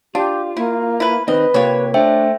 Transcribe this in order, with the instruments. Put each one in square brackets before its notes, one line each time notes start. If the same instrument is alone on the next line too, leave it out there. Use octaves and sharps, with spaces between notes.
[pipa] D4 [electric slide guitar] F4 [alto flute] G4
[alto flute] A#3 [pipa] E4
[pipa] E4 B4
[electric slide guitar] D#3 C4 D#4 [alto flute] B4 [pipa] D#5
[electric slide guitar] C3 A#3 G4 [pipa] F4 C#5
[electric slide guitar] A3 [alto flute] D4 [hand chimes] C5 E5 G5